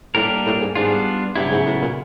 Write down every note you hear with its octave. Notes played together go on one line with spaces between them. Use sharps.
A2 G3 A#3 D4 G4 A#4
A2
G#2
G#2 G3 B3 D4 F4
G2 C#3 F#3 B3 E4
G#2
A2
A#2